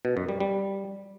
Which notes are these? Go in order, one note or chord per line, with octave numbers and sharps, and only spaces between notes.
B2
F#2
G3
G3